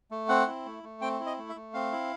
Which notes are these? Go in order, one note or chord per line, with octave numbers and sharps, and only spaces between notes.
A3
C4 F#5
E4
A3
A3
C4 G5
E4
D#5
A3
E5
A3
C4 F5
E4